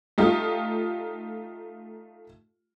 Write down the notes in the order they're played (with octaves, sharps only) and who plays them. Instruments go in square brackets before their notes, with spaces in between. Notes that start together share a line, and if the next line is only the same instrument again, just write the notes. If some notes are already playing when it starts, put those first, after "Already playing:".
[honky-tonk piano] A3 D#4 F4 G4